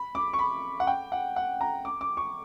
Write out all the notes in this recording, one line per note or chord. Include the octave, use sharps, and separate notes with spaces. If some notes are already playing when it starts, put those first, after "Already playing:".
Already playing: B5
D6
C#6
B5
F#5
G5
F#5
F#5
A#5
D6
D6
C#6